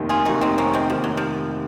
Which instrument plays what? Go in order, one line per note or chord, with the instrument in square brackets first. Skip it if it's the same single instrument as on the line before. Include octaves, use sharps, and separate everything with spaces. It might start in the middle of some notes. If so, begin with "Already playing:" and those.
Already playing: [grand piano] F1 D#2 D#3
[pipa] F4 G#4
[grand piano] F1 D#2 D#3 [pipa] D#4 F#4
[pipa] C4 D#4
A#3 C#4
G#3 C4
[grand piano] F1 D#2 D#3 [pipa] F3
[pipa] F#3
F3